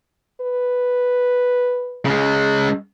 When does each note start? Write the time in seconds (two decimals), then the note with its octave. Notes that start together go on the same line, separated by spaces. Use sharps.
0.41 B4
2.06 C#3 G#3